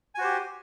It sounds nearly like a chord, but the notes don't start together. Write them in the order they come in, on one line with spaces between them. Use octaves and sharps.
G#5 F#4 C5 G4